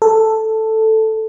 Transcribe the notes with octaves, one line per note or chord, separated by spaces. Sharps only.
A4